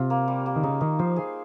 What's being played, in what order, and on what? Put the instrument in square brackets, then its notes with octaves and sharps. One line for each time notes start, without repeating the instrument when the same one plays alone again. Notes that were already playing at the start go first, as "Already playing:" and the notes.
Already playing: [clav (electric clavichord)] C3 [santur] F4
[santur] A#3
G3
A#3
[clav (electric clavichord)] D#3
[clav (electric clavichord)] C#3 [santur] D#4
[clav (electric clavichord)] D#3 [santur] D#4
[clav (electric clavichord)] F3 [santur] C5
[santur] G#4